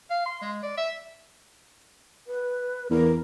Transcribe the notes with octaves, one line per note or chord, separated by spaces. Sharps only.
F5
C6
G#3
D5
E5
B4
E2 A#4